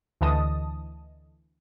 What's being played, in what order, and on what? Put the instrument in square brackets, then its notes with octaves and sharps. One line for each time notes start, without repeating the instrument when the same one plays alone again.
[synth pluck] D2 D3 E3 D#5 A5 D#6